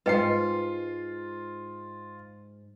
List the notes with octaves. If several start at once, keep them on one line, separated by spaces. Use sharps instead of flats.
G#2 F4 B4 D#5 G5 C7